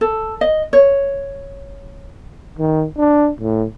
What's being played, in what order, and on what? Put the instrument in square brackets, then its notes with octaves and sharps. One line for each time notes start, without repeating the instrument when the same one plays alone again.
[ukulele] A4
D#5
C#5
[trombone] D#3
D4
A2